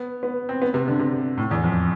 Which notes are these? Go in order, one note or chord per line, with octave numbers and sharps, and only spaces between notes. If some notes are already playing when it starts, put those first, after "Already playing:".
Already playing: B3
B3
C4
B3
C3
D3
C3
A2
E2
F2